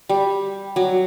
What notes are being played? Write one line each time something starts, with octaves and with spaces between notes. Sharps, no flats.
G3
F#3